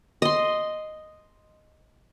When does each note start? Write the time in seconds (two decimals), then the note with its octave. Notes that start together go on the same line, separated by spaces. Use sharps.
0.22 D#5 C6